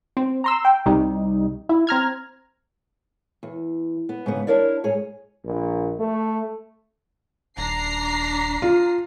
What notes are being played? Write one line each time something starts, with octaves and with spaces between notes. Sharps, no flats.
C4
A#5 C6 E6
G5
C2 C3 G3 D#4
E4
C4 A#5 F6 G#6
E2
B3
G#2 C#3 B3
D4 E4 A#4 C#5 D5
G#2 G#4 C#5
A#1
A3
D#1 D4 A#5 C7
F4